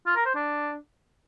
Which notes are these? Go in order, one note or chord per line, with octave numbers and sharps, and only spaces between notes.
F4
A#4
C5
D4